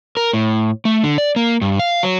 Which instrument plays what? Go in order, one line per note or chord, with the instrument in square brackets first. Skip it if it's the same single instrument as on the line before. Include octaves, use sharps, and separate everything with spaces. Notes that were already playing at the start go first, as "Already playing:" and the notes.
[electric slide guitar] A#4
A2
A3
D3
D5
A#3
G2
F5
F#3